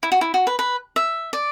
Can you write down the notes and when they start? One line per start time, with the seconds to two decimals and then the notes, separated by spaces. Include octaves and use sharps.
0.03 E4
0.12 F#4
0.21 E4
0.34 F#4
0.47 B4
0.59 B4
0.96 E5
1.33 D5